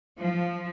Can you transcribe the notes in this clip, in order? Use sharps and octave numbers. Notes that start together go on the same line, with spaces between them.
F3